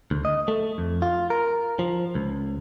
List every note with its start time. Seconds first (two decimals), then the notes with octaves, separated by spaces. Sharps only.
0.11 D2
0.25 D#5
0.48 A3
0.78 F2
1.02 F4
1.30 A#4
1.79 F3
2.15 C#2